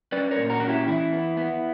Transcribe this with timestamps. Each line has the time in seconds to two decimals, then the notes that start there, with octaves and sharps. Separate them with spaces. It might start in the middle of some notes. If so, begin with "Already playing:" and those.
0.12 C#4 B4 D5
0.31 A#4 C#5
0.37 A#2
0.49 F#4 A#4
0.60 C#4 F#4
0.69 E4 G4
0.87 E3 E4
1.13 B3
1.37 B3